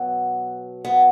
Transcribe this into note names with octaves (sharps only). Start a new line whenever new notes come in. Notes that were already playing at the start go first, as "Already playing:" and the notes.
Already playing: B2 F#3 B3
B3